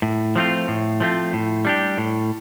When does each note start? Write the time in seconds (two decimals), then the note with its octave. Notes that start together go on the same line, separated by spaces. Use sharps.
0.02 A2
0.36 F3 A3 C4 F4
0.68 A2
1.00 F3 A3 C4 F4
1.33 A2
1.65 G3 D4 G4
1.98 A2